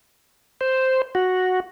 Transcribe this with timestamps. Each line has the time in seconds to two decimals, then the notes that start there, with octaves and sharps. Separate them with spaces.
0.61 C5
1.15 F#4